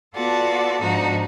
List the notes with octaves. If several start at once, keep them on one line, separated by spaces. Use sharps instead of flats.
B3 F4 F#4 A4 D5 A5
G#2 F3 D4 D#4 F#4